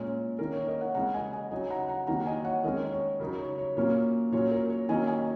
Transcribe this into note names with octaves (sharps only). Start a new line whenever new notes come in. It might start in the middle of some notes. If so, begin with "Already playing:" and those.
Already playing: A#2 G#3 C#4 C#5
D#3 A#3 C#4 A#4
C#5
A#4 D#5
C#5 F#5
C#3 G#3 C#4 F#5 A#5
D#5 G#5
D#5 G#5
C#3 F#3 D#4 D#5 G#5
F#5 A#5
F#5 A#5
D#3 F#3 A#3 F#5 A#5
D#5 G#5
C#5 F#5
D#3 G#3 C#4 A#4 D#5
C#5
C#3 F#3 D#4 A#4
C#5
C#5
A#2 F#3 A#3 C#4 C#5
A#2 F#3 C#4 C#5
A#4
C#5
D#3 F#3 A#3 C#4 D#5 G#5
D#5 G#5